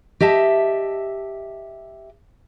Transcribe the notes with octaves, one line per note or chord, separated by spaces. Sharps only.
G4 D#5 E5 A5